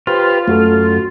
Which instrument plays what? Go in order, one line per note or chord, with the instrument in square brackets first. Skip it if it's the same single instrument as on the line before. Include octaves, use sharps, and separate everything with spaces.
[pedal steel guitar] F4 [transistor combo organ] G4 B4 C5
[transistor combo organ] F#2 [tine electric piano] A3 F#4 A4